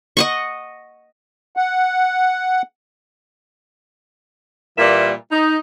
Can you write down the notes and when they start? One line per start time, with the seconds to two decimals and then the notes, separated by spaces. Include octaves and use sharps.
0.17 D#5 F#5 C#6
1.57 F#5
4.78 A#2 E3 G3 A#3 E5
5.31 D#4